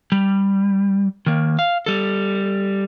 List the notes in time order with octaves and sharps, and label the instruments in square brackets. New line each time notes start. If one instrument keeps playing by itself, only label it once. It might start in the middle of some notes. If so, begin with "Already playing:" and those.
[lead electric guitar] G3
D#3 A#3
F5
G3 A4